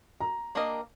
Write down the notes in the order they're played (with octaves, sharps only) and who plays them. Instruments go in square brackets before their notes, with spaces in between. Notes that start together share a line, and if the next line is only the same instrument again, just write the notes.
[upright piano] A#5
[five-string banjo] A#3 D4 G4 A#4 D#5